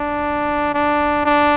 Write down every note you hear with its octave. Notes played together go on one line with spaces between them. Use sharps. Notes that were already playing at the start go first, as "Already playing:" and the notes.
Already playing: D4
D4
D4